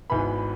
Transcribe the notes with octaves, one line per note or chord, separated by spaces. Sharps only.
G#1 G#2 E3 B3 B5